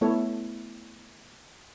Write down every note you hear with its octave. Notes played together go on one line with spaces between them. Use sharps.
A3 B3 E4 A4 C#5